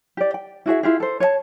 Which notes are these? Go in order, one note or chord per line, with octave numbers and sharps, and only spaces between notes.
G4 D5
G5
E4 F#4 G#4 E5
E4 F4 G4 G#4
A4 C5
C#5 D#5 A5